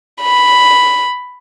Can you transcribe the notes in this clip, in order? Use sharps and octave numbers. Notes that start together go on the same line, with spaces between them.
B5